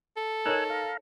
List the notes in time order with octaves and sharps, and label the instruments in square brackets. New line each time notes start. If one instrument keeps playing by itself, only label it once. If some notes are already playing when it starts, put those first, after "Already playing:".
[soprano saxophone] A4
[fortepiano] D#4 A#4 C#5 [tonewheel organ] G#5 E6 F#6
[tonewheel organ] F5 A#5